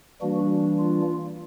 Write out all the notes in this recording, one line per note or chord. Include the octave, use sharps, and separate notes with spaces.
E3 G3 A#3 D4 F#4
F4